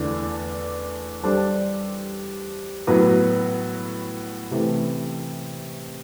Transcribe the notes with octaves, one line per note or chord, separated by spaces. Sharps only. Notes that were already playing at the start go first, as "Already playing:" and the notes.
Already playing: E2 D3 A3 D4
G3 D4 A4 C5
A2 F#3 B3 F#4 B4
C3 E3 A3